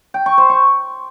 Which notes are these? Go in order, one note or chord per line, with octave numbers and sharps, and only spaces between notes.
G5
C#6
C5
C#6